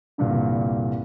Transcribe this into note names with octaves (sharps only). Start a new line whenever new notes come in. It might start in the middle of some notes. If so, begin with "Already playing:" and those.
C2 G2 A#2 D3